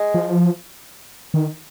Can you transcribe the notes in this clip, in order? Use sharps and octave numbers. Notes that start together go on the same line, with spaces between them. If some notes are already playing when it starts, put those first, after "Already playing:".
Already playing: G#3
F3
D#3